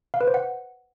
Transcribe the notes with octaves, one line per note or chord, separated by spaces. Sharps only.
F5
B4
C5
F#5